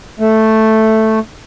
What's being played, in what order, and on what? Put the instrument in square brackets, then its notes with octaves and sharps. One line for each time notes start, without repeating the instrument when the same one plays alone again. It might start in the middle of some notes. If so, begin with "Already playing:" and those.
[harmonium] A3